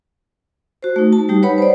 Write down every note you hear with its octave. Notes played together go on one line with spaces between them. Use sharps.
F#4 C5
A3 D#4
A5
G3 D#4 G4
B4 C#5 F#5 B5
C5 D5